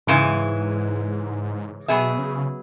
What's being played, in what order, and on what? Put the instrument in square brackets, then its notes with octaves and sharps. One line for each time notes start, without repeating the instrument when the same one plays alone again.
[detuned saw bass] G#2 [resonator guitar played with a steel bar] C#3 E3 G#3
[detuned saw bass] B2 [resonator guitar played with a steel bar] F#3 B3 G#4 E5
[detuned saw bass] C#3